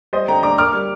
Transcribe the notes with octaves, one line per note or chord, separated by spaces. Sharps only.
G3 C5 D#5
D3 G5 A#5
D4 A#5 D6
A#3 D6 F6
G3